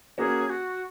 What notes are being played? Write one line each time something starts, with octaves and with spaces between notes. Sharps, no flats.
A#3 C#4 F#4 G#4
F#4